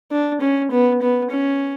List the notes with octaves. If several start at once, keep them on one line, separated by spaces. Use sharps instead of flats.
D4
C#4
B3
B3
C#4